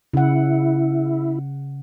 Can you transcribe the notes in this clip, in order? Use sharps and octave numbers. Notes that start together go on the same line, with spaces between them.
C#3 E4 F#5